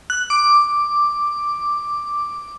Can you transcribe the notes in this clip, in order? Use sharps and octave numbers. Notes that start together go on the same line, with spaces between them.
F#6
D6